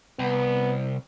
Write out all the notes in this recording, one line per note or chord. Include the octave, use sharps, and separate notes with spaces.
C2 B3